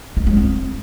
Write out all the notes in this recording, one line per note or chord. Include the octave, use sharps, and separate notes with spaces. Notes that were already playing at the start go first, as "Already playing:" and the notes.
G#3
G#3
C4